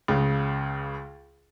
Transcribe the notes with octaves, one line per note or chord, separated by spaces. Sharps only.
C#2 C#3